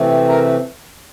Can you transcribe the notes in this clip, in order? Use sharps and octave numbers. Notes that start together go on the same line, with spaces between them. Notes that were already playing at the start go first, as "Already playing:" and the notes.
Already playing: C3 E3 A3 C4
A#4 A#5